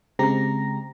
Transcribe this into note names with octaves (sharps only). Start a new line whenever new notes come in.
C#3 G#3 C4 G4 A#5 A#6